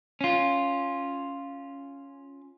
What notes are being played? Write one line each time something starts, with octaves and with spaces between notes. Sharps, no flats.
C#4 F4